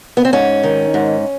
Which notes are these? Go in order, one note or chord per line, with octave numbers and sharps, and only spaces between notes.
B3
C4
G#2 C#4
D#3
G#2